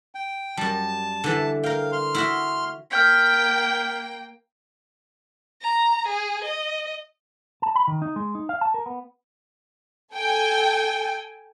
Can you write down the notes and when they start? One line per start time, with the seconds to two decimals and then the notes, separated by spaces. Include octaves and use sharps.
0.15 G5
0.57 F#2 G3 A5
1.24 D3 E3
1.63 A#4 F5 G5
1.92 C6 F6
2.14 E4 F#4 E5
2.91 A#3 G5 F6 G6 B6
5.62 A#5
6.07 G#4
6.44 D#5
7.62 A5
7.76 B5
7.87 D#3
8.02 D#4
8.16 G#3
8.35 D#4
8.49 F5
8.61 A5
8.74 A#4
8.86 B3
10.14 A4 G5 G#5